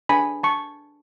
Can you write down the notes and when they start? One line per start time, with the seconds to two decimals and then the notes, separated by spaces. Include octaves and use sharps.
0.09 D4 G#4 B4 G#5 B5
0.43 A5 C#6